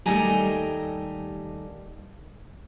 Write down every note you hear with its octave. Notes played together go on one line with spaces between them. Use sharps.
D#2 G3 A3 D#5 G#5 A#5